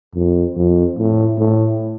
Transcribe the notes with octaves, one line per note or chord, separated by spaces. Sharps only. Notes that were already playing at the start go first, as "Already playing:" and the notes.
F2
F2
A2
A2